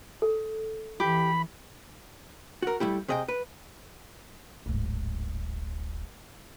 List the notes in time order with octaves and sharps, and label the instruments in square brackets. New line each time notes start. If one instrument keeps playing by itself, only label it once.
[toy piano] A4
[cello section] E3 [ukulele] G4 [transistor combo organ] B5
[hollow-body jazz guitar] F#4 A#4
G3 A3 E4 G4
C3 G#4 D#5 F5 G5
B4
[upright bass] D1 G#1